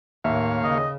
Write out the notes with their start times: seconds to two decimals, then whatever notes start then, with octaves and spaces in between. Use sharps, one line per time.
0.24 D#2 A2 A#3 C#5 E5 F5
0.64 C#3 D#5